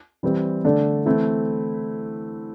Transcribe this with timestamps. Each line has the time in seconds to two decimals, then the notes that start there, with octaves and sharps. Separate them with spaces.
0.23 E3 G3 C4 E4
0.64 D3 A3 D4
1.06 E3 A3 C4 E4